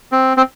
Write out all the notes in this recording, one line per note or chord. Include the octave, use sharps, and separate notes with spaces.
C4
C4